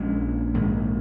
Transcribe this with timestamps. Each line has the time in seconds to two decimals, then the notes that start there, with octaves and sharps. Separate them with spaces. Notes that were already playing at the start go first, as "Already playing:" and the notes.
Already playing: A#1 A#2 G#3 C#4
0.54 A#1 G#2 D#3 G#3